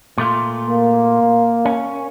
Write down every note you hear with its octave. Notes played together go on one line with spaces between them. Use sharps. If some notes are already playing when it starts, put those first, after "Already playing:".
A#2 A3 F4
A#3
C#4